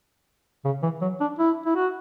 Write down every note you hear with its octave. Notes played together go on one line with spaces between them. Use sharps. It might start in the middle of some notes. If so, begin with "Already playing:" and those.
C#3
E3
F#3
D4
E4
E4
F#4